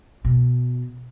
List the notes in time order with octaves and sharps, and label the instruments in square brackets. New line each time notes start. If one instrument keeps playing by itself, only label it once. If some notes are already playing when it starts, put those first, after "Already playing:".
[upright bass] B2